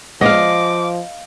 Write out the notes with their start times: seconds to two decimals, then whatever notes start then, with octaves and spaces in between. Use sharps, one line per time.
0.21 F3 G#3 B3 G#4 D#5 F5 D6